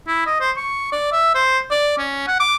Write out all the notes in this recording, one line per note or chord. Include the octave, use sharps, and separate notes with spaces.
E4
D#5
C5
C#6
D5
E5
C5
D5
C#4
F#5
D6